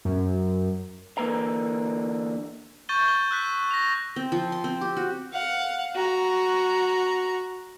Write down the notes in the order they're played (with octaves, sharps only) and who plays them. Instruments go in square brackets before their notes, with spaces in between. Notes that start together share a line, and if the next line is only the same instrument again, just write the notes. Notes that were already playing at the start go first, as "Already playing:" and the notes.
[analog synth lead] F#2
[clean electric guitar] D3 E3 A#3 B4 A#5
[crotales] C#6 G6 A6 D#7 G7
A6 G7
E6 F#6 B6
A#6 F7
[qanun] C4
F3
C6
C4
G4
F#4
[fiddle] F5 F#5
F#4 A#5